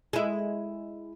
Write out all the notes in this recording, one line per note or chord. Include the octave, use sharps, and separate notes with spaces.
G#3 E4